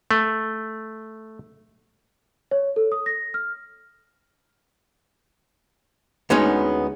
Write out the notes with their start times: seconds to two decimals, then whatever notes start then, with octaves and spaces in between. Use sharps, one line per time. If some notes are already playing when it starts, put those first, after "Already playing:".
0.11 A3
2.51 C#5
2.76 A4
2.92 D#6
3.06 A#6
3.34 F6
6.30 D2 G#3 B3 C#4 D#4 C#5